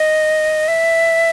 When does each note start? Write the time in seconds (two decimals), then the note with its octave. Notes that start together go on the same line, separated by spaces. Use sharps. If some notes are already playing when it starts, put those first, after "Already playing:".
Already playing: D#5
0.68 E5